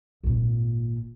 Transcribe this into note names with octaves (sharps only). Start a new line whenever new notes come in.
G#1 A#2